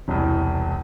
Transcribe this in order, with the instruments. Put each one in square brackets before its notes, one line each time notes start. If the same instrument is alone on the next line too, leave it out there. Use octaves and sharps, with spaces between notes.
[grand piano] E1 C2